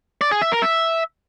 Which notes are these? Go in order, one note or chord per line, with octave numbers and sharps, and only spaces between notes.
D5
G#4
E5
A#4
E5